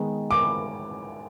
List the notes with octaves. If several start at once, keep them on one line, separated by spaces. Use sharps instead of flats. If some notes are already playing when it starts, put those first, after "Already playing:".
Already playing: D#3 G#3 B3
D6